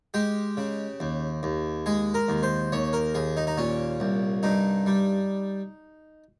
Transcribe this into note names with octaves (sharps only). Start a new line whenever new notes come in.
G#3 G4
C#3
D#2
D#2
G#3 G#4
A#4
D#2
C5
D#2 C#5
A#4
D#2 G#4
D#4
D#4
A#2 C#4
C2
G2 D#4
G3